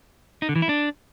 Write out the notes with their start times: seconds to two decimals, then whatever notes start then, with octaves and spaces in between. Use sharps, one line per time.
0.42 D#4
0.49 D3
0.56 E3
0.62 E4
0.69 D4